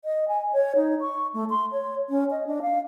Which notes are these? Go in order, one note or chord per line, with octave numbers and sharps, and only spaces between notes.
D#5
G#5
C#5
D#4
C#6
A3
C6
C#5
C#4
D#5
D4
F5